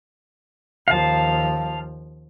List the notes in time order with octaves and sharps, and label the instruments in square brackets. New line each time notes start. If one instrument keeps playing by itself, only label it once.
[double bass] D#2 F3 [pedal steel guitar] F5 A5